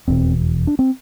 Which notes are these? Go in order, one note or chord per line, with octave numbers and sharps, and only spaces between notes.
F1 E2 B2 C4
D4
C4